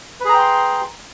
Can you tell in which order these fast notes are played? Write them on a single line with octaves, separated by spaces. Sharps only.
B4 G#4 A#5 G5 C6